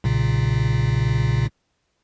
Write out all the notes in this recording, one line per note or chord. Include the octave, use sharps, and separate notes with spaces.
B1 A#2 C#3